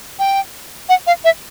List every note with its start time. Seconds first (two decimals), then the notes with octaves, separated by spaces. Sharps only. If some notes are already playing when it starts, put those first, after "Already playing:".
0.19 G5
0.89 F#5
1.07 F5
1.24 E5